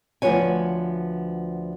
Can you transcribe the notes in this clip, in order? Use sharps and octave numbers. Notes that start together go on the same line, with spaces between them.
D2 F3 B3 F4 C#5 G#5